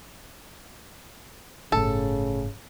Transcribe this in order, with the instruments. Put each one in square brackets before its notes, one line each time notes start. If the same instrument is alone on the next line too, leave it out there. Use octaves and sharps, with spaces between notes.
[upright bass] G1 A2 [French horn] C#3 [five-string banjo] A4